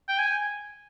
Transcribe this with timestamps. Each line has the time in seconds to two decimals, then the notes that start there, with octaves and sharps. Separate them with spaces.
0.08 G5
0.18 G#5